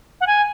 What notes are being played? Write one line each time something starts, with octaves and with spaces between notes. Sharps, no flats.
F#5
G#5